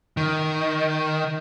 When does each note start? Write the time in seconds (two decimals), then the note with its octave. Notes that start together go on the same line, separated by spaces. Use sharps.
0.17 D#3